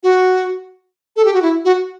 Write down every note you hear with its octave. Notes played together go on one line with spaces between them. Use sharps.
F#4
A4
G4
F#4
E4
F#4